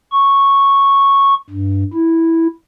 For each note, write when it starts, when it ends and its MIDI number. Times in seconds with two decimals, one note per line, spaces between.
0.12 1.35 85
1.50 1.83 43
1.93 2.47 64